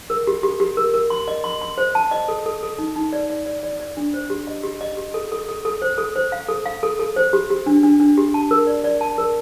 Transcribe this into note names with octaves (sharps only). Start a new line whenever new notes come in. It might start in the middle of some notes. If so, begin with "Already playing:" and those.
A#4
G4
G4
G4
A#4
A#4
C6
D#5
C6
C6
C5
A5
D#5
A4
A4
A4
D#4
D#4
D5
D5
D5
D5
D5
D4
C5
G4
D#5
G4
D#5
G4
A4
A4
A4
A4
C5
A4
C5
F5
A4
F5
A4
A4
C5
G4
G4
D4
D4
D4
G4
A5
A#4
D5
D5
A5
A#4